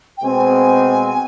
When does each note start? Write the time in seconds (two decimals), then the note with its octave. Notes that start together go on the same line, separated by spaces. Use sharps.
0.17 G5
0.23 B2 G#3 C4 G#5